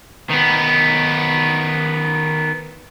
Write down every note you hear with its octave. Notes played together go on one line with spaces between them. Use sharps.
D#3 B3